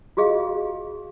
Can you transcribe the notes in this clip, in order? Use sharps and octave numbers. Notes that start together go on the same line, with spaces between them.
F4 F#4 G#4 D#5 F5